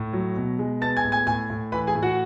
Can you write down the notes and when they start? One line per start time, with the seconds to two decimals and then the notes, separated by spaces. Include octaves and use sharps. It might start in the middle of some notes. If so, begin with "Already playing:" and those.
Already playing: A2
0.13 F#3
0.36 B2
0.59 G#3
0.82 B3 A5 A6
0.96 G#5 G#6
1.05 A2
1.12 G#5 G#6
1.27 A2 G#5 G#6
1.50 A2
1.72 E3 B4 B5
1.87 G#4 G#5
1.95 A2
2.02 F#4 F#5